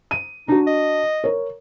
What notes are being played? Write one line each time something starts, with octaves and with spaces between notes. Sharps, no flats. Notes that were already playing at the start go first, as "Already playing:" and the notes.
D#7
D4 D#4 F#4
D#5
A#4 C#5